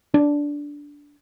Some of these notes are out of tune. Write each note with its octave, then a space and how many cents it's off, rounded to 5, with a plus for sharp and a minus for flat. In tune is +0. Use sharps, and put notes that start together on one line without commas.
D4 -10